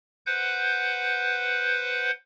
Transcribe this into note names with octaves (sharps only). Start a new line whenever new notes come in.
B4 C5 F#5 G6